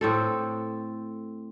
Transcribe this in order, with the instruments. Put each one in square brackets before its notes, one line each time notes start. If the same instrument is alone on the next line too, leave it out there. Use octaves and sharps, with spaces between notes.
[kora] A2 C4 A4